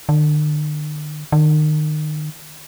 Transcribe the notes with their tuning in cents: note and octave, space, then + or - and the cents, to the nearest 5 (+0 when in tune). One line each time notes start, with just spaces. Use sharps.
D3 +45
D#3 -30